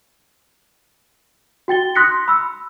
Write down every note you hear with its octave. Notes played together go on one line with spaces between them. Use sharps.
F#4 G5 A6 G7
C6 D#6 F#6 A#6 B6 C#7
B5 E6